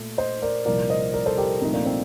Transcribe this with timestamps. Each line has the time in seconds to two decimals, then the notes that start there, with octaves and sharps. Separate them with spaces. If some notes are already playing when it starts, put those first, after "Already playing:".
Already playing: A#2 A3
0.18 C5 D#5
0.42 A#4 D5
0.66 C2 A#2 F3 A#4 D5
0.90 C5 D#5
1.13 A#4 D5
1.26 A4 C5
1.38 G4 A#4
1.61 C2 A#2 F3 A3 C4 D#4
1.74 A#3 D4
1.85 C4